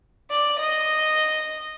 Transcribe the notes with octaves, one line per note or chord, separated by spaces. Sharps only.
D5
D#5